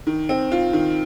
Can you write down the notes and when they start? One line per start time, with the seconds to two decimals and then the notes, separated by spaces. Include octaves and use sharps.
0.07 D#3
0.29 C4
0.52 F4
0.73 D#3